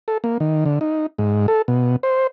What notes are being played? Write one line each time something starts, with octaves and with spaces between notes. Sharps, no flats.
A4
A#3
D#3
D3
D#4
G#2
A4
B2
C5